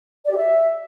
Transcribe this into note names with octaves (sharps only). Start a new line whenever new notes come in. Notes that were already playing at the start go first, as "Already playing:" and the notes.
D5
G4
E5